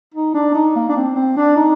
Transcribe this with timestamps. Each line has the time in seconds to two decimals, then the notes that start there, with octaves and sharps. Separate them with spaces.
0.14 D#4
0.35 D4
0.54 D#4
0.75 A#3
0.89 D4
0.96 C4
1.16 C4
1.37 D4
1.57 D#4